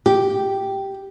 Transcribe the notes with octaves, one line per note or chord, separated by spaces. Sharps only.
G4